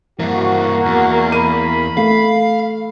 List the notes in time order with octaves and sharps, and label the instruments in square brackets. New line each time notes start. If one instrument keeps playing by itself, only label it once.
[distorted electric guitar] G2 E3 [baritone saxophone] A#3 [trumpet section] F#4
[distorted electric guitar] E2
[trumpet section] B5 [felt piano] D#7
[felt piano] A3 [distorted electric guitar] F5